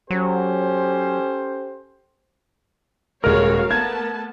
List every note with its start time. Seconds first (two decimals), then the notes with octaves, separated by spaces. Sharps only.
0.10 F#3 C#4 G4 A4 C5
3.24 D#1 G#3 F#4 A#4 C#5 F5 F6
3.71 A3 B3 A5 G#6